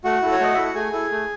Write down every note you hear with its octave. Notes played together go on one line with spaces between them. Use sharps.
A3 F#4 F#5
E4 A4
C#5
A3 D#5
E4 A4 E5
F#5
A3 G#4 G#5
E4 A4
A3